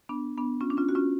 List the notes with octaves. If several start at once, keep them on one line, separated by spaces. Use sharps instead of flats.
B3 D4
B3 D4
C#4 F4
D4
C#4 F4
F#4
C#4 F4